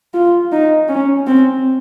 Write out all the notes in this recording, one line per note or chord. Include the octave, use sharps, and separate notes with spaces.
F4
D#4
C#4
C4